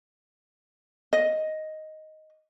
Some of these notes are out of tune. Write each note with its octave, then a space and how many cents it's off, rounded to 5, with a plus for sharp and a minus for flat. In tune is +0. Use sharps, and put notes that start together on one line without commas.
D#5 +5